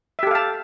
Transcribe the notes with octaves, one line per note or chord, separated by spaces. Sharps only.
G4 A4 E5 F5 A5